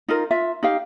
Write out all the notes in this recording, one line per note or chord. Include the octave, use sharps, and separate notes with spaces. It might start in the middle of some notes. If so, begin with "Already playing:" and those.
D#4 F4 A#4
F4 E5
D#4 G4 F5